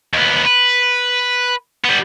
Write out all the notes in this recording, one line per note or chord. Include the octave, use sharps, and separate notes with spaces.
D#2 B3
B4
G3 B3